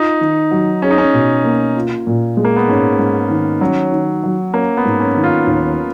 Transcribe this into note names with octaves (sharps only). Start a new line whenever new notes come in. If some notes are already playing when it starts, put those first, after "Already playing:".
Already playing: D#4 F4
D#3
F#3
C#4 G#4
D#4
C#4
B2
A#3
F4
A#2
G#3
A#3
B3
G#2 C#4
G#2
D#3
F#3 C#4
D#3
F#3
A#3 C#4
B3
G#2
C#4
D#3
F4
D#2